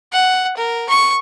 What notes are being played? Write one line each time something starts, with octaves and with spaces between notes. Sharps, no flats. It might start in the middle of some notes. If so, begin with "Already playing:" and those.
F#5
A#4
C#6